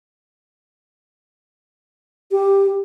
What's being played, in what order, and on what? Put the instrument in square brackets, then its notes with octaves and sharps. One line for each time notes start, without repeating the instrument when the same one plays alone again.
[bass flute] G4